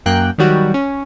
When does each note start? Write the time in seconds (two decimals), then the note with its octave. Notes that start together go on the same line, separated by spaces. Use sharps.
0.06 F#2 A#3 G5 F#6
0.38 D#3 F#3 G3 F#4
0.74 C#4